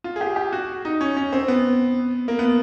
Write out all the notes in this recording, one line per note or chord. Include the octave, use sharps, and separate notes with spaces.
F4
G#4
G4
G4
F#4
D#4
C#4
C#4
C4
B3
A#3
B3